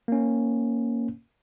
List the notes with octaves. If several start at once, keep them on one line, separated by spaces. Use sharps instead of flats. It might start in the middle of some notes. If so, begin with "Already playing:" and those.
A#3 C#4